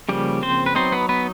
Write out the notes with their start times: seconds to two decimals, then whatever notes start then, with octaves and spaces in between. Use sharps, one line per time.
0.09 C#3 F3 G3 A#3 G4
0.43 C4 C5
0.66 B4
0.75 F#3 B3 C4 D#4 C5
0.92 B3 B4
1.09 B3 B4